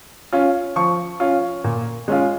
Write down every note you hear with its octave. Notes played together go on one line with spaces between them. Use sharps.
C#4 F4
F3 C#6
C#4 F4
A#2
G#3 C#4 F4